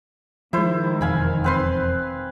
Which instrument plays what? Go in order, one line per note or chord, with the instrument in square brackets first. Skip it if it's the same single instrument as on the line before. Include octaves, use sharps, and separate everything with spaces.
[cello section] D#3 [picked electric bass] F3 G#3 [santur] E4 C5
[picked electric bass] E1 F2 [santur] F5 G#5 B5
[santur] C4 B4 C6